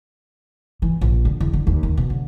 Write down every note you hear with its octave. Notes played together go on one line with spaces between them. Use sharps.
E3
A#1
D3
E2
D3
D#2
D#3
B2
D3